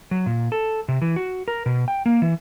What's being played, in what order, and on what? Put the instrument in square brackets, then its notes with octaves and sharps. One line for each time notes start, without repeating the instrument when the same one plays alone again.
[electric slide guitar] F#3
A#2
A4
C3
E3
F#4
A#4
B2
G5
A#3
E3